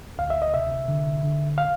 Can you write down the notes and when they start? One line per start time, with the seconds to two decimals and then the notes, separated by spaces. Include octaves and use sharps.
0.18 D2 F5
0.30 E5
0.42 D#5
0.54 C3 E5
0.88 D3
1.23 D3
1.58 F5